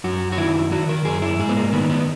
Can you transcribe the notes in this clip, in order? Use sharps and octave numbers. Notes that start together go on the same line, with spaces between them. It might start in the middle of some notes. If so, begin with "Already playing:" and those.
F#2 F#4
F#4
D#3 E4
D#3 F#4
A#4
F#2 G#4
E4
G#2 G#4
B3
A#3
D#3 B3
B3